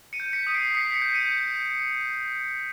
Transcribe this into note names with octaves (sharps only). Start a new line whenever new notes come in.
C#7 D#7
G6
B6 C#7
D#6 D#7
C7 D7
D#6 B6 C#7
B6 C#7
G6
C#7 D#7